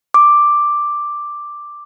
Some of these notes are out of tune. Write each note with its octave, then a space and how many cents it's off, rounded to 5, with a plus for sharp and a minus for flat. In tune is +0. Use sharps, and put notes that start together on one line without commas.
D6 +5